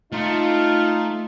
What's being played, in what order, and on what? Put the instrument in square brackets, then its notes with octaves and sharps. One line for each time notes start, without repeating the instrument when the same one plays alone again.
[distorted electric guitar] A3 [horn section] D#4 F4